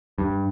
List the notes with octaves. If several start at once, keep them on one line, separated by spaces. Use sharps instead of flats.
G2